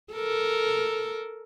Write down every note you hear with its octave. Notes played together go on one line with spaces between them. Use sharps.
A4 A#4